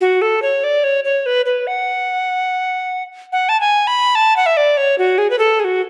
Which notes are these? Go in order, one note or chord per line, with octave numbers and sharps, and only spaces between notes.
F#4
A4
C#5
D5
C#5
C#5
B4
B4
F#5
F#5
A5
G#5
B5
A5
F#5
E5
D5
C#5
F#4
G#4
B4
A4
G#4
F#4